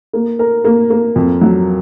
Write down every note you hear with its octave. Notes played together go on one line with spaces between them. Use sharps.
A#3
A#4
A#3
A#3
F2
F#3